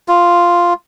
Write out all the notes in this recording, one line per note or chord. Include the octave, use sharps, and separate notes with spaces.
F4